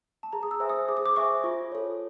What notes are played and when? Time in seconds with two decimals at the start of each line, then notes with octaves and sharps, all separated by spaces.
0.23 A5
0.33 G#4 A#5
0.43 D#6
0.51 E6
0.60 C5 E5 G#5
0.70 D#6
0.88 G#4 D6
0.97 D#6
1.06 D6
1.16 C5 E5 G#5 C#6
1.44 F4
1.72 A4 C#5